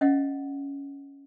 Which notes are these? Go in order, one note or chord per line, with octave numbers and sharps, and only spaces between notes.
C#4 D#5 F5 F#5